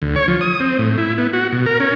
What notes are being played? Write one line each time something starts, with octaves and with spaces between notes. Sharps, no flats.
D2
C#5
F3
D#6
C4
A2
E4
B3
F#4
B2
A#4
C#4